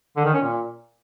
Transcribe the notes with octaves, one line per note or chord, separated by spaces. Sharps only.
D3
D#3
C#4
A#2